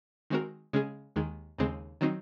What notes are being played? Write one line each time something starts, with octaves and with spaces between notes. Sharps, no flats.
D#3 G#3 C4 F#4 A#4
C#3 G#3 C#4 G#4
D#2 D#3 G#3
D#2 C#3 G#3 C4
D#3 F#3 C4 D#4